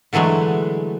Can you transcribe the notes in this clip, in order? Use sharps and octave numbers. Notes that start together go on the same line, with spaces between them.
D3 E3 F#3 G#3 A3